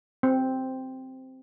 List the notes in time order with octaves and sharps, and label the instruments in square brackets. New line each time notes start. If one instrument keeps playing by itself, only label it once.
[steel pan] C4